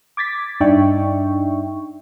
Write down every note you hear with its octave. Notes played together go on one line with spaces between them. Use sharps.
D6 G#6 A6 B6
G2 D4 D#4 E5 G5 C#6